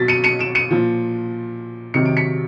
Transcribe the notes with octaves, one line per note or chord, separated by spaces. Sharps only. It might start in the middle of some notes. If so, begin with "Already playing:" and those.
Already playing: B2 F#3 A6 B6
C#7 D#7
C#7 D#7
D7 E7
C#7 D#7
A#2 F3
C3 D#3 F#3 C#7
D7
B6 C#7